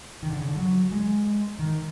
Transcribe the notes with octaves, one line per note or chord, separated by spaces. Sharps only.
D#3
D3
C#3
D3
F#3
G#3
D#3